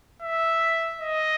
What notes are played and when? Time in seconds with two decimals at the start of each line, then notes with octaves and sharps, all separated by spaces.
0.22 E5
1.01 D#5